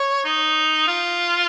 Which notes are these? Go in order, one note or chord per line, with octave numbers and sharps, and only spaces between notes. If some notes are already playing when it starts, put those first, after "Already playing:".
Already playing: C#5
D#4
F4